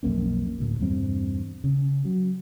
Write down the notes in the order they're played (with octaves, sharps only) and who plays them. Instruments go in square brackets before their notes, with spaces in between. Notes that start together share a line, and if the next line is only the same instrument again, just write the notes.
[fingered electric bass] B1 F2 A#3 C#4
D2 A2
E2 G2 B2 C4
C#3
F#3